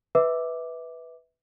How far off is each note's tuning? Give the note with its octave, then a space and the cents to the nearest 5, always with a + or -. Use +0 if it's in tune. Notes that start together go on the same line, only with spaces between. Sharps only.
B4 +0 E5 -25 D6 +0